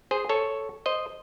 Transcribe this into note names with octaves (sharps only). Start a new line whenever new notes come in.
G#4 C5
A4 C#5
C5 D#5